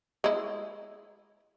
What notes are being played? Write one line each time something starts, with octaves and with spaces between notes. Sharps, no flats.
G#3 E4